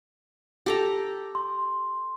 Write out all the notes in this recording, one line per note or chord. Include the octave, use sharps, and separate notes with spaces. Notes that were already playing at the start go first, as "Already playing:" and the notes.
G4 A4 A#5
C6